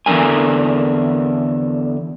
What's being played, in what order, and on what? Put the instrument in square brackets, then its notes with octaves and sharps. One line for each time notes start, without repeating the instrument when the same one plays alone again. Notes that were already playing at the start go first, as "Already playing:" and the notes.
[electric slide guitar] E2 G#2 D3 A#4 G#5